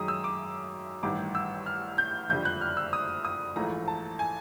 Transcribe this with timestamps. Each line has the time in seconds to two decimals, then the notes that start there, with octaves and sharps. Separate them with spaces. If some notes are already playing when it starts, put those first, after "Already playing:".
Already playing: F#2 D#3 G#3 D#6
0.08 E6
0.24 D6
1.03 A1 G2 D#3 D6
1.35 E6
1.66 F6
1.98 G6
2.29 F#1 F2 D3 G3 G6
2.45 F#6
2.61 F6
2.77 E6
2.93 D#6
3.25 D#6
3.56 A#1 G#2 E3 A3 A#5
3.88 A5
4.19 G#5